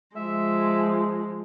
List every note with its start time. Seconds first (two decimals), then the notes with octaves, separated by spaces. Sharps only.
0.16 F3 G#3 E5